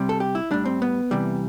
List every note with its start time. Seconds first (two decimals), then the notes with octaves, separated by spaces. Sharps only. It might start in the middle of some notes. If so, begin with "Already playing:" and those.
Already playing: C3 G3
0.09 A4
0.20 G4
0.35 E4
0.51 A2 G3 D4
0.65 C4
0.82 B3
1.11 C3 E3 G3